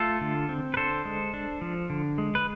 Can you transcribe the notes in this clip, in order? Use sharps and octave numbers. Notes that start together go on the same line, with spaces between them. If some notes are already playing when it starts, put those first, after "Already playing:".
Already playing: A3 F4 A4
D3
C4
B4
D3 A4 C5
G#3
D4
F3
D3
G#3
B4